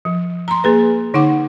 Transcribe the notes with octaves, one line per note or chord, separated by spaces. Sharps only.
F3
A#5 C6
A#3 G#4 B4
D3 D#4 F#5 D6